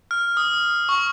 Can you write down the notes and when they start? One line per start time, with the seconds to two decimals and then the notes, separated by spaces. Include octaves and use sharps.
0.11 F6
0.37 D#6
0.89 C#6